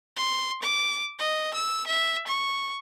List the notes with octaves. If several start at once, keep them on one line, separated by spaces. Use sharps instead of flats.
C6
D6
D#5
E6
E5
C#6